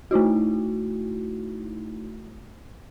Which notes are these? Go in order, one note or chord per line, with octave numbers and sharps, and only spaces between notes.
A3 D#4 E4 F#4